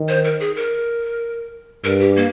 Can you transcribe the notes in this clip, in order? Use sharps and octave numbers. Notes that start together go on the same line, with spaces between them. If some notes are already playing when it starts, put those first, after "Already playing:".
Already playing: D#3
C5
A#4
G#4
A#4
G2 A#4
G4
A#3